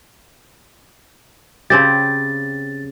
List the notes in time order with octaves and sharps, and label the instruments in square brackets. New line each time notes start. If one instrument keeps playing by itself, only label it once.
[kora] C#3 C4 G4 [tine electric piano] A6